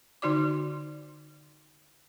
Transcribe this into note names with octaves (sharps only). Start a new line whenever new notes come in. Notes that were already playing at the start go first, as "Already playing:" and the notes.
D3 D#4 F#4 D5 D6